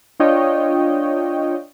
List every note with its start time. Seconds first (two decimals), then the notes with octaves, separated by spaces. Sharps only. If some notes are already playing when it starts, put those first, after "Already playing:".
0.20 D4 F4 C#5 D#5 G5